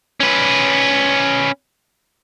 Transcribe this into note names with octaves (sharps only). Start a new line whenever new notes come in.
C#4 B4